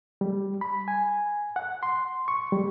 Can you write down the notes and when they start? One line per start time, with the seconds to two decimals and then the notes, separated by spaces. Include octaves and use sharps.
0.21 G3
0.61 B5
0.88 G#5
1.56 F#5
1.83 C6
2.28 C#6
2.52 G3